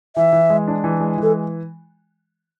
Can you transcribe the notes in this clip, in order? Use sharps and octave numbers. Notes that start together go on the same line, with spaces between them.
E3 E5
E3
G#3
D4
E3
G#3
E3 A4